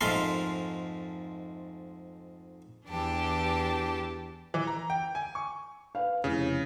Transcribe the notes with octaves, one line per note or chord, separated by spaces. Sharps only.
F2 G#2 A3 A#4 F5 C6
E2 E3 D4 G4 A5
E3
A#5
G5
G#5
C#6
B4 F5
F1 C#3 E4